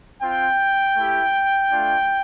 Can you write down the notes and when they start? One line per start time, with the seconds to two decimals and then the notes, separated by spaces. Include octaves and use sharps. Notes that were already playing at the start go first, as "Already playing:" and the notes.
0.22 C4 F4 G5
0.96 A3 E4 G4
1.71 A3 D4 F4